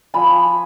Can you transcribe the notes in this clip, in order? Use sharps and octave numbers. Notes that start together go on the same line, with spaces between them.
F3 G#5 B5